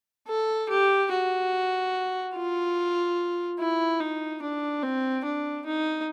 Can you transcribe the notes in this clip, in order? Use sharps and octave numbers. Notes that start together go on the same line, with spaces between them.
A4
G4
F#4
F4
E4
D#4
D4
C4
D4
D#4